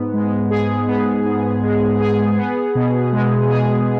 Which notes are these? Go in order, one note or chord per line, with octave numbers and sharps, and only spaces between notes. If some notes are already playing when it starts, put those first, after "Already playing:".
Already playing: G#2 B3
G#3
G#4
B3
G#2
G#3
G#4
B3
B2
G#3
G#4